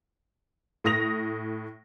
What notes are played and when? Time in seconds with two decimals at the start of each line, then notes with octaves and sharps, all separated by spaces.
0.84 A2 D#6 A#6 F7